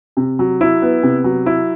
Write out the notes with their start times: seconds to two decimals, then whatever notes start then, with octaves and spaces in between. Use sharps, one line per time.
0.17 C3
0.39 F#3
0.61 E4
0.82 B3
1.03 C3
1.24 F#3
1.46 E4